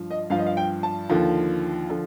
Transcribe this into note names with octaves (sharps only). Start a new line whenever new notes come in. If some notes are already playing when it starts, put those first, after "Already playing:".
Already playing: G2 F3
D#5
G2 F3 F5
D#5
F5
G5
A5
D#2 D3 F3
D3 F3